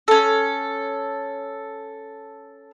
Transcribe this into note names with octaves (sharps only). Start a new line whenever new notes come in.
C#4 A4